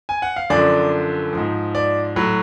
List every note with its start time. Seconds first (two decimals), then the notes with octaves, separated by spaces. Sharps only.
0.09 G#5
0.22 F#5
0.36 F5
0.50 F#2 D3 F3 D5
1.33 G#2 F3
1.75 D5
2.16 A2 F#3